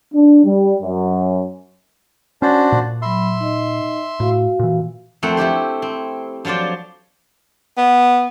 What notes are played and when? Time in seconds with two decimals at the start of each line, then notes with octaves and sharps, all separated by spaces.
0.13 D4
0.44 G3
0.81 F#2
2.42 C#4 D4 F#4 C5
2.72 A#2
3.02 F#3 E5 B5 C6
3.40 D#4 D#5
4.20 A2 F#4 F5
4.59 A#2 E3
5.23 F2 A3 C4 A#4 F#5
5.37 A3 E4 G4 C5
5.82 C4
6.45 F3 F#3 F4 C5 D5
7.77 B3